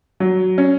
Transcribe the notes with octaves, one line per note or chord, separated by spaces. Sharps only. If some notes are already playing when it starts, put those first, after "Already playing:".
F#3
C#4